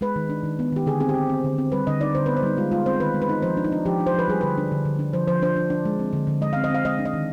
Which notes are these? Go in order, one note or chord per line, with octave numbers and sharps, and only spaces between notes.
G#3 B4
D#3
D4
D#3
B3
D#3 G4
D3 G#4
C4 G#4
G4
C4
C4
D3
C4
G3 B4
D3 D#5
D#4 D5
D3 C5
B3 B4
C5
G3 D#4
G#3 F4
G#3 F4
C4 C5
D#3 B4
G#3
B4
D#4
F3 C5
D4
D#4
D4
F3 G4
D4
C5
F3 B4
G3 G#4
D3 B4
D4
D3
D3
D4
F3 C5
F3 C5
D4 C5
D4
D4
G#3
C4
D3
D3
G#3 D#5
C4 F5
D#5
C4 F5
G#3 D#5
D4
D#5
D#3